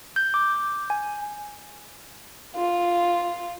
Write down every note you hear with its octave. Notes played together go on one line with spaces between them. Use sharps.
G6
D6
G#5
F4